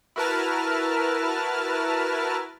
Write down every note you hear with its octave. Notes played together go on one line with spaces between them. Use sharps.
E4 F#4 A#4 B4 A5 F6